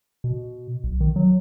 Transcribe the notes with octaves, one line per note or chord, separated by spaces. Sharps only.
B2
B1
D#3
F#3